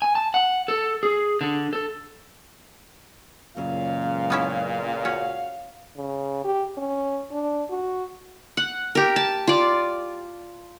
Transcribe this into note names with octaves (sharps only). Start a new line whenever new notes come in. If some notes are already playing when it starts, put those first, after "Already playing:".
G#5
A5
F#5
A4
G#4
D3
A4
C#2 F#2 A#2 C#3 F5
B3 C#4 E4
C#4 F#4
C#3
G4
C#4
D4
F#4
F#5
G4 A#4
A5
F4 D5